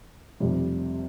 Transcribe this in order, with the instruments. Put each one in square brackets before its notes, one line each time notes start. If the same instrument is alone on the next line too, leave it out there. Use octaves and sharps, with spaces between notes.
[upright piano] F1 F2 C3 G3